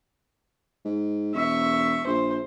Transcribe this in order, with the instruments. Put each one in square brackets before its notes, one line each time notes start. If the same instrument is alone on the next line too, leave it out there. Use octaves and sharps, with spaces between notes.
[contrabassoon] G#2
[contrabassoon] E1 [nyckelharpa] E5 C#6
[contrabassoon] A#1 [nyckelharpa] C5